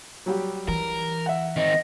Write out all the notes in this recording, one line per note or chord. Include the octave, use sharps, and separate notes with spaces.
F#3 G3 G4
E3 A#4
E5 F#5
D#3 C4 D#5